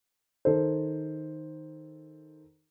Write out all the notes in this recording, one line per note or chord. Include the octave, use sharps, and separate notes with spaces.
D#3 A4 C5